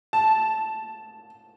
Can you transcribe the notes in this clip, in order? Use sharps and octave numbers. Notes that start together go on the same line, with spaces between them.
A5